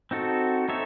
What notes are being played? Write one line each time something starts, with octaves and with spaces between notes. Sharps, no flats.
C4 D#4 F#4 A4
C4 D#4 A4 C#5 E5